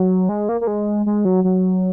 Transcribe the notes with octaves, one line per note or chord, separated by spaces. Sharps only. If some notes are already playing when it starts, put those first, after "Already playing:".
Already playing: F#3
G#3
A#3
A#3
G#3
G#3
F#3
F#3